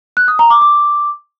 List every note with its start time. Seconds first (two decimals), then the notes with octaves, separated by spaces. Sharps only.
0.17 F#6
0.28 D#6
0.39 A#5
0.50 D6
0.62 D6